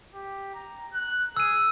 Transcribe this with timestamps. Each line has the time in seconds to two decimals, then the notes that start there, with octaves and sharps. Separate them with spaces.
0.14 G4
0.54 A#5
0.93 F#6
1.37 G#4 E6 D#7